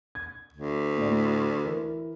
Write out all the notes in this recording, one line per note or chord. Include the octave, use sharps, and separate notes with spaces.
G#6
D2
A2 D5
E3 A#4